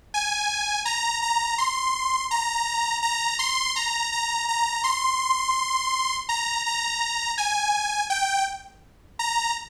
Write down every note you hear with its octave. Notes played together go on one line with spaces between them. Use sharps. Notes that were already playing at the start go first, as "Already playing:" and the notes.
G#5
A#5
A#5
C6
A#5
A#5
C6
A#5
A#5
A#5
C6
A#5
A#5
G#5
G5
A#5